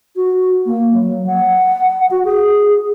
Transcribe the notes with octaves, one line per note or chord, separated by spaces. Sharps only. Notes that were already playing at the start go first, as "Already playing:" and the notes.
F#4
A#3
F#3
F#5
F#4
G#4